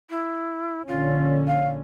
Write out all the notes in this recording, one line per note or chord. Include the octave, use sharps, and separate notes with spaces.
E4
A#1 D3 C#4 F4
F5